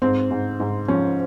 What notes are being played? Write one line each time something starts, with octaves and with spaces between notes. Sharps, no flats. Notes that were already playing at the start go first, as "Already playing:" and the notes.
G#2 C4
G#2
G#2
F3 C#4